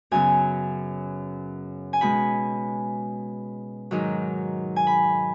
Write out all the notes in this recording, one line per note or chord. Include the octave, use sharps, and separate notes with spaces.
F#2 C#3 F#3 B3 G#5
G#5
B2 G#3 C#4 B5
G#2 D#3 F#3
G#5
B5